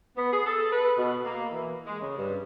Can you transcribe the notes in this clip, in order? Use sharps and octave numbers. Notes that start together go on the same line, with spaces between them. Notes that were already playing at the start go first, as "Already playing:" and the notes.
B3
G#4
A4
B4
B2
A#3
E3
G#3
C#3
G2